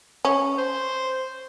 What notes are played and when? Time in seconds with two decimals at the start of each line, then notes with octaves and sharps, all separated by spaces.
0.25 C#4
0.58 C5